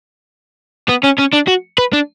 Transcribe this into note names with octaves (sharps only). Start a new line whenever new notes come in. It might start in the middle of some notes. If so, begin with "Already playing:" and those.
B3
C#4
C#4
D4
F#4
B4
D4